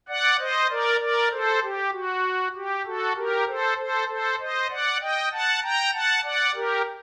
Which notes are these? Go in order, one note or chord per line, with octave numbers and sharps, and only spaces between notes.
D5 F#5
C5 D#5
A#4 D5
A#4 D5
A4 C5
G4
F#4
G4
F#4 A4
G4 A#4
A4 C5
A4 C5
A4 C5
C5 D#5
D5 F#5
D#5 G5
F#5 A5
G5 A#5
F#5 A5
D5 F#5
G4 A#4